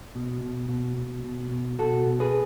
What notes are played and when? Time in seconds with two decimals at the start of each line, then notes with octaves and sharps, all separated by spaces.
0.15 B2
0.41 B2
0.69 B2
0.97 B2
1.24 B2
1.51 B2
1.79 B2 F#4 A4
2.06 B2
2.20 G#4 B4